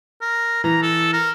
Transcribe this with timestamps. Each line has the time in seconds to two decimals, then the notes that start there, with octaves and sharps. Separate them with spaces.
0.21 A#4
0.64 E3 A#5
0.82 A4
1.13 A#4